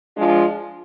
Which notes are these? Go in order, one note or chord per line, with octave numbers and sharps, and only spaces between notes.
F3 G#3 D4 F4